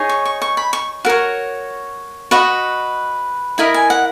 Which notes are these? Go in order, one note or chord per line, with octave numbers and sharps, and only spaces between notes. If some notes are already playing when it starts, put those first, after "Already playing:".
Already playing: D#4 G#4 C#5
C#6
C#6
C#6
B5
C#6
F#4 A#4 C#5
F#4 B4 D#5 C#6
E4 A#4 D#5 B5
G#5
F#5